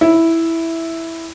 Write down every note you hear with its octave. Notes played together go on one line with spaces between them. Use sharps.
E4